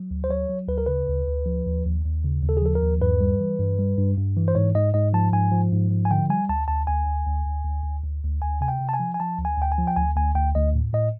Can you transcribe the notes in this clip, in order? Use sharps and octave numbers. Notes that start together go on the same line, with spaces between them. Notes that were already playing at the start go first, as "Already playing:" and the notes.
Already playing: F#3
D2
C5
F#3 C#5
F#3
D2 B4
A#4
C#3 B4
D2
D2
F3
D#2
D#2
D#2
C#3
D#2
A4
G#4
F3 A4
A#4
D#2
G2 B4
G3
E3
G2
G3
G2
G2
E3
C5
G#2 C#5
G#2 D#5
G#2 D#5
F3 A5
G#2 G#5
F3
G#2
F3
G#5
D3 G5
G3 G#5
D2 A5
D2 A5
D2 G#5
D2
D2
D2
D2
D2
D2
D2
D2 G#5
C3 G#5
G5
C3
A5
G#5
F3
G#5
F3 A5
D2
G#5
D2 G5
G#5
F3
G5
D2 G#5
D2 G#5
D2 G5
D2 D#5
A2
A2 D#5